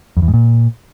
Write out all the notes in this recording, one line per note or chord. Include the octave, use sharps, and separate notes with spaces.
F2
E2
G#2
A#2